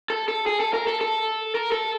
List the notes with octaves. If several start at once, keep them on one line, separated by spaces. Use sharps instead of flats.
A4
A4
G#4
A4
A#4
A4
A4
A#4
A4